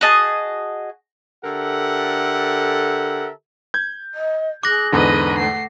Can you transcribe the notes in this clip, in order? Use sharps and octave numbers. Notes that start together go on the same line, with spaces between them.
F#4 G#4 D#5 A5
D3 G4 A4 A#4 E5 F#5
G6 G#6
D#5
G#4 D6 F#6 A#6
E2 G#2 D3 B4 D#5
A3 F#5 C7